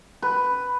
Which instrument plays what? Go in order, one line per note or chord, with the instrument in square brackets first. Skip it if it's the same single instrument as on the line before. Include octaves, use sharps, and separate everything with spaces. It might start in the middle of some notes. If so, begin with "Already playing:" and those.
[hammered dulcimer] B4